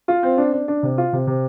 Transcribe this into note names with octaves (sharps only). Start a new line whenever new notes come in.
F4
C4
D4
D4
D4
C3
F4
C3
C3